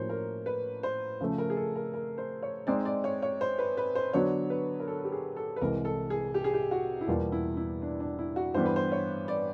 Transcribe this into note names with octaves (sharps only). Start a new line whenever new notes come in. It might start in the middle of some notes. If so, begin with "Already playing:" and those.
Already playing: A2 F3 A#3 C#4 F#4 C5 C#5
A#4
B4
C5
C#3 F3 A3
A#4
G#4
A4
A#4
A#4
C5
C#5
G#3 C4 D#4 D5
D5
C#5
C#5
C5
B4
B4
C5
D3 F#3 B3 D4 F#4 C#5
B4
A#4
A4
G4
G#4
A4
B4
C2 C3 E3 G#3 A#4
A4
G#4
G4
G#4
G4
F#4
E4
E2 B2 G3 A#3 F4
E4
E4
D4
D4
E4
F#4
G2 E3 G3 B3 C5
B4
C5
C#5
D5